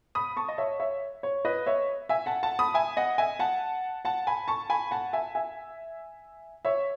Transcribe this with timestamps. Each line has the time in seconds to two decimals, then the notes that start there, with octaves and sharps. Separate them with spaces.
0.15 B5 D#6
0.37 A5 C#6
0.48 D#5
0.58 C#5 E5
0.80 C#5 E5
1.23 C#5
1.45 B4 D#5
1.66 C#5 E5
2.09 E5 G#5
2.26 F#5 A5
2.43 F#5 A5
2.59 B5 D#6
2.74 E5 G#5
2.97 D#5 F#5
3.18 E5 G#5
3.39 F#5 A5
4.05 F#5 A5
4.27 G#5 B5
4.48 A5 C#6
4.70 G#5 B5
4.91 F#5 A5
5.13 E5 G#5
5.35 E5 G#5
6.65 C#5 E5